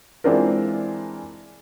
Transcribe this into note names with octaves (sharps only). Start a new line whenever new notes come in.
E3 G#3 C4 D4 F4 A#4